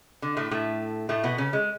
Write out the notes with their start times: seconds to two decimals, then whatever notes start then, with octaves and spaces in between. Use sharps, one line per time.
0.22 D3
0.37 A2 A3
0.51 A2 A3
1.09 A2 A3
1.23 B2 B3
1.38 C#3 C#4
1.53 G#3